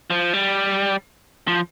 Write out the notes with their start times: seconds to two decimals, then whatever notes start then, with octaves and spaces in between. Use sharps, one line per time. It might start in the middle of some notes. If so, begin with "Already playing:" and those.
0.10 F3
0.33 G3
1.48 F3